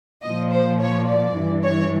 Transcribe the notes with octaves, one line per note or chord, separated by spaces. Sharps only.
A#2 F3 D#5
C5
C#5
D5
G2 E3
C#5